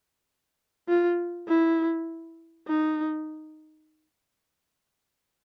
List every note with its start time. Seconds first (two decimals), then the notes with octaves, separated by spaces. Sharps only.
0.89 F4
1.48 E4
2.68 D#4